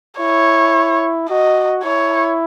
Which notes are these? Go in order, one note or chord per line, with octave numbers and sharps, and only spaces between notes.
E4 C#5
F#4 D#5
E4 C#5